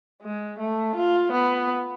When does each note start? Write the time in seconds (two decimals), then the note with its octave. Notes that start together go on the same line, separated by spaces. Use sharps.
0.23 G#3
0.59 A3
0.96 F4
1.32 B3